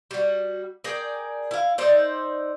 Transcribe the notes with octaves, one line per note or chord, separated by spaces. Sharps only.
G3 F#4
G#4 A#4 D5 G5
E4 F5
D#4 C5 D5 E5